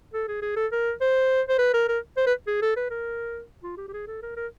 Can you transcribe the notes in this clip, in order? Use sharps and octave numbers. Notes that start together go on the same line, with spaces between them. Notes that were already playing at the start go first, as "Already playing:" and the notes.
A4
G#4
G#4
A4
A#4
C5
C5
B4
A#4
A#4
C5
B4
G#4
A4
B4
A#4
F4
G4
G4
G#4
A4
A#4
A#4